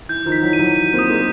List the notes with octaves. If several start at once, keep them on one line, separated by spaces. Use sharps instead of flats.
E3 G6
D#3 F3
B6
E3 F#3
D#7
E3 F#3
D#7
A#3 C4
D#6
G#3 A#3